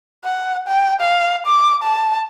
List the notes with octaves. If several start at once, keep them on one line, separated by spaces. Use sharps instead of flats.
F#5
G5
F5
D6
A5